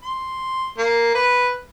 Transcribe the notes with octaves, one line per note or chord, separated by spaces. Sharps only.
C6
A#3
B4